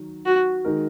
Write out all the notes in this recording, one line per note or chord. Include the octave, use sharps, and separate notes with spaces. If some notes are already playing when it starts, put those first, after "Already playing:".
Already playing: D#3 F#3
F#4
D#3 G#3 D#4 A#4